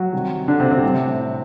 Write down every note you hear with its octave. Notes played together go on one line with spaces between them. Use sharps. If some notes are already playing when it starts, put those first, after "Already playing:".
Already playing: F#3 F#4
C3 D#3 G3
D3 D4
C3 C4
C3 C4
A2 G3